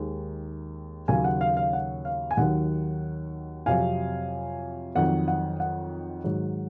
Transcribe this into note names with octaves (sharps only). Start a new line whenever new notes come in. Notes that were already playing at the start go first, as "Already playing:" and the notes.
Already playing: D#2 D#3 G#3
D#2 C#3 F#3 F5 G#5
F#5
F5
F5
F#5
F5
G#5
D#2 D#3 F#3 F#5
F2 C3 F#3 F5 G#5
F2 D#3 F#3 F#5
F#5
F#5
G#2 D#3 F#3